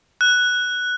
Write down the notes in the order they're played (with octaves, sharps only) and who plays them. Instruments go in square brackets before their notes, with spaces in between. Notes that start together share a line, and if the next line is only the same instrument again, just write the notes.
[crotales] F#6